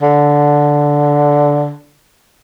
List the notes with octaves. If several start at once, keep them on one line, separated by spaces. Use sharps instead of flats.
D3